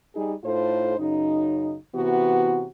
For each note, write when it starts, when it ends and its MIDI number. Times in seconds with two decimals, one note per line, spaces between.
0.15 0.33 55
0.15 0.33 63
0.15 0.33 68
0.44 0.96 45
0.44 0.96 63
0.44 0.96 65
0.44 0.96 69
0.44 0.96 72
0.98 1.76 42
0.98 1.76 49
0.98 1.76 63
1.95 2.66 48
1.95 2.66 52
1.95 2.66 59
1.95 2.66 66